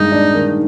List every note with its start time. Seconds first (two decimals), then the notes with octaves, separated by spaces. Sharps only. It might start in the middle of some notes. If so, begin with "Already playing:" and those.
Already playing: G2 D#3 G#3 D#4
0.12 D4
0.34 D#3